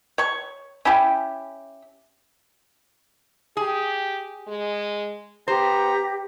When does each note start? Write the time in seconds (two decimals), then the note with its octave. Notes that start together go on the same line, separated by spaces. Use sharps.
0.18 C#5 C#6
0.85 C#4 E4 G4
3.57 G4 G#4
4.47 G#3
5.48 B3 G4 C5 A#5